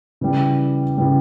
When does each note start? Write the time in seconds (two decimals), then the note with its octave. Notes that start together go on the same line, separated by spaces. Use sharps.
0.21 C#3 E3 G3
0.98 C#3 E3 G3